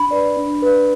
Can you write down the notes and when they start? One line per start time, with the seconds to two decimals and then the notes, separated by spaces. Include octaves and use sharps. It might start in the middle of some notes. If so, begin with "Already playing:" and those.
Already playing: D4 B5
0.11 B4 D5
0.37 D4
0.62 B4 D5